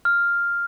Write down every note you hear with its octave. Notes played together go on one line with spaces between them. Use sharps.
F6